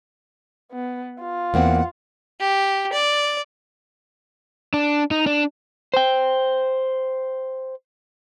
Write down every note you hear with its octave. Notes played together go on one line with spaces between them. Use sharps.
B3
F4
E2 A#3 C4 F#5
G4
D5
D4
D#4
D4
C5 G5